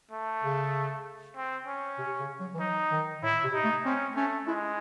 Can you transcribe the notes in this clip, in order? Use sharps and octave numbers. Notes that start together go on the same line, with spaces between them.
A3
C#3
C4
C#4
C3
C#3
F#3
E3
F#3 D#4
D#3
A2 E4
C3
D#4
A3
C4 C#4
A3 C#4
G#3 E4